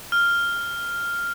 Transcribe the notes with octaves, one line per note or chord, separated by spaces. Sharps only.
F6